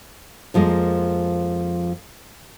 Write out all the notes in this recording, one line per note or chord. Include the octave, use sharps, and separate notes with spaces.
F2 F3 G#3 A#3